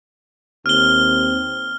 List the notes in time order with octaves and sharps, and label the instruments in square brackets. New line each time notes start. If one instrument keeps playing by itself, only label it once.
[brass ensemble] D#2 C4 [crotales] F6 G7